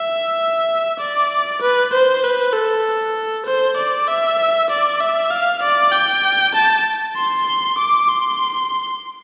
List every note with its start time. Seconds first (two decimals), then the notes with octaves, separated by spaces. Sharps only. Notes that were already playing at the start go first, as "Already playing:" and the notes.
Already playing: E5
1.00 D5
1.62 B4
1.93 C5
2.24 B4
2.53 A4
3.46 C5
3.77 D5
4.08 E5
4.70 D5
5.01 E5
5.31 F5
5.63 D5
5.92 G5
6.54 A5
7.16 C6
7.78 D6
8.09 C6